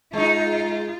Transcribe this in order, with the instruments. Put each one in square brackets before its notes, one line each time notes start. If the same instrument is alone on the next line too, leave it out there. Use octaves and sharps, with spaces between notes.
[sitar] G#3 D#4 [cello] F4